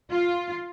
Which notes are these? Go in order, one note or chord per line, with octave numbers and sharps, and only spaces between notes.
F4